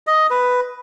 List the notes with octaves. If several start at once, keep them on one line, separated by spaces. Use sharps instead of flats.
D#5
B4